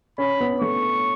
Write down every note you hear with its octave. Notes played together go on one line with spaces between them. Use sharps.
C#4 B5
B3
A3 C#6